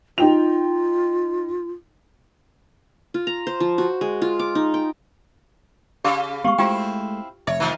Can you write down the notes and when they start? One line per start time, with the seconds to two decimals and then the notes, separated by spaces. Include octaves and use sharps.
0.18 D#4 F4 G5 F7
3.14 F4
3.27 A#5
3.47 C5
3.60 F3
3.78 F#4
4.01 G#3
4.22 F4
4.39 D6
4.55 D#4
4.74 G5
6.04 C#3 G4 F5 D6
6.44 G#3 A#3 B3 G4 F5 C#6
6.58 G#3 A3 C4 E4 F4 G4 G5
7.47 F1 C#5 E5
7.60 D#3 F3